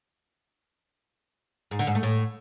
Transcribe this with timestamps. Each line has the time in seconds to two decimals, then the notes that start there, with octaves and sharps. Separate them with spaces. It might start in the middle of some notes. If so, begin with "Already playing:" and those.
1.71 G#2
1.79 D3
1.87 G#2
1.95 A3
2.03 A2